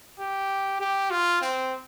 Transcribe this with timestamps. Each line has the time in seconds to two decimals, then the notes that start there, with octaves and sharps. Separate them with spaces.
0.20 G4
0.81 G4
1.11 F4
1.41 C4